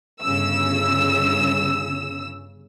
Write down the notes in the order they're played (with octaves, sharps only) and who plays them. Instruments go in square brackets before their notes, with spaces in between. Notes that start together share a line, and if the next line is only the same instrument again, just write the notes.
[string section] G1 C#3 E6